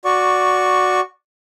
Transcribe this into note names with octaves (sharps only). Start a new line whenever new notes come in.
F#4 D5 C#6